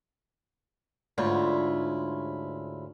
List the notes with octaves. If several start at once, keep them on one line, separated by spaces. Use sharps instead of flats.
D2 G#2 E4 F4 C#5